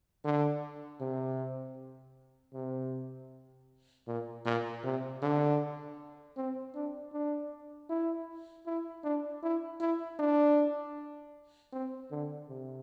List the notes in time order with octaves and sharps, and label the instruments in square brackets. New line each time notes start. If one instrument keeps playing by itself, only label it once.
[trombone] D3
C3
C3
A#2
A#2
C3
D3
C4
D4
D4
E4
E4
D4
E4
E4
D4
C4
D3
C3